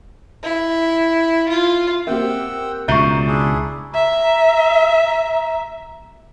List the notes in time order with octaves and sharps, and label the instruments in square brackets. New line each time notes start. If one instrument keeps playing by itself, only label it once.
[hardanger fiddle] E4
F4
[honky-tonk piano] A#3 C4 G4 [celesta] E5 [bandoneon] F#5 G5 E6
[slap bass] C#2 B2 [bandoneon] D5 [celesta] E5 C#6 [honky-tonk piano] A#5 G6 C7
[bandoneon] D4 E4 G#4
[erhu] E5 [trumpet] A#5